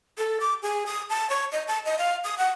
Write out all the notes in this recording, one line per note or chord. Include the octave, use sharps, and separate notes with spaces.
A4
D6
G#4
D#6
A5
C#5
D#5
A5
D#5
F5
D#6
F#5